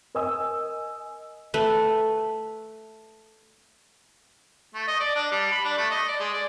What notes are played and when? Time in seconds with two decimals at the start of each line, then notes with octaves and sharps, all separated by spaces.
0.15 A#4 D#5 G#5 D#6 E6
1.54 A3 B4
4.75 A3
4.88 D#5
5.00 D5
5.15 D4
5.31 G3
5.51 B5
5.65 D4
5.78 A3
5.91 D#5
6.08 D5
6.20 G#3
6.33 D5